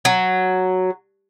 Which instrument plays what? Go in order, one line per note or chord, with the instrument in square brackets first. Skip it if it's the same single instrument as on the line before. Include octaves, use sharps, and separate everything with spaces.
[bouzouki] F#3